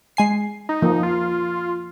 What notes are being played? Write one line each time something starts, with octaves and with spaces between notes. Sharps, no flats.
G#3 G#5 C7
D#4
F3 A#3
F4